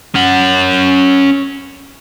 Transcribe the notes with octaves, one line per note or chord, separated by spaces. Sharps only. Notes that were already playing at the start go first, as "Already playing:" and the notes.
C#4 F#5